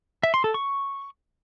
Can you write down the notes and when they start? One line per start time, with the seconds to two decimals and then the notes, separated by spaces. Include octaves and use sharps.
0.23 E5
0.34 C6
0.44 A4
0.54 C#6